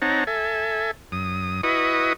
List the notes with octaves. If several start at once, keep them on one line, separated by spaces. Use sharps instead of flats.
C4 D#4 C#5 F#5 A5 A#5
A4 E5 G#5
F#2 D#6
E4 F#4 B4 D#5 C#6 D#6